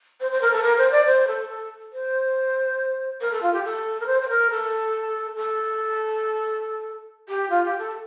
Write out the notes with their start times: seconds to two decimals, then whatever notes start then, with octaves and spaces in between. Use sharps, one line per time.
0.20 C5
0.31 C5
0.41 A#4
0.52 A4
0.63 A#4
0.78 C5
0.91 D5
1.06 C5
1.28 A4
1.49 A4
1.92 C5
3.21 A#4
3.32 A4
3.42 F4
3.53 G4
3.64 A4
4.00 A#4
4.06 C5
4.22 C5
4.29 A#4
4.50 A4
5.36 A4
7.29 G4
7.50 F4
7.65 G4
7.79 A4